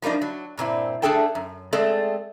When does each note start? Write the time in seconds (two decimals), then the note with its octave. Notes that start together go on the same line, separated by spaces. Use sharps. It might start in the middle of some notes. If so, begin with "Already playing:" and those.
0.02 F3 G3 A#3 D4 D#4
0.21 F#3
0.58 G2 A#2 C4 E4
1.02 A3 D4 G#4 A4 G5 A5
1.35 F#2
1.73 G#3 A3 C4 G#4 A4 D5